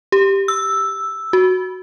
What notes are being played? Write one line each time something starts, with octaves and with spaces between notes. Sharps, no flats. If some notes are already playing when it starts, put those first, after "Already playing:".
G4
E6
F#4